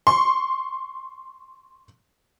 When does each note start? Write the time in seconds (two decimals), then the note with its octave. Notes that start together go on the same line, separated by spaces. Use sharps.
0.07 C6 C#6